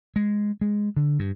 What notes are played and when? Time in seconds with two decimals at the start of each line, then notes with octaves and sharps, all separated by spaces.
0.16 G#3
0.61 G#3
0.97 D3
1.19 G2